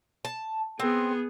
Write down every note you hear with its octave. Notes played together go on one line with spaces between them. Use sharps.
A5
B3 C4 G#4